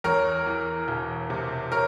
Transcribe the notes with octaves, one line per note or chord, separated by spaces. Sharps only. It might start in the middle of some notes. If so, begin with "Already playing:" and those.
E2 A#4 C#5
E3
E1
C3
A#4 C#5